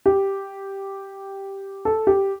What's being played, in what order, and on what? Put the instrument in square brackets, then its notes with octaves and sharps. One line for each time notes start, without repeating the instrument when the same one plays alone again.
[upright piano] G4
A4
G4